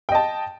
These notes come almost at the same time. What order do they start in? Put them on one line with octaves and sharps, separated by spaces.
G5 D#5 A5